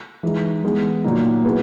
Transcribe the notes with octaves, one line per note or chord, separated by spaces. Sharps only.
E3 G#3 D#4
E3 G#3 B3
A#2 F#3 A#3 D#4
F#3 B3 E4 G#4 B4